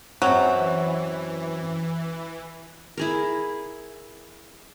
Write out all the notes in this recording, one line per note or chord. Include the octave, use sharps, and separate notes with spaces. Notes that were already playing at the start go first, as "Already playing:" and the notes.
F#2 E3 F#3 C4 F#5
E4 G#4 A#4